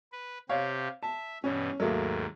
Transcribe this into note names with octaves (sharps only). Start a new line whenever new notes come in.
B4
C3 G4 C#5 F5
E5 A5
G2 B2 E3 C#4
D#2 G#2 F#3 A3 A#3